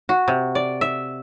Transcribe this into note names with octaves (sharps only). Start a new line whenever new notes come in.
F#4
C3
D5
E5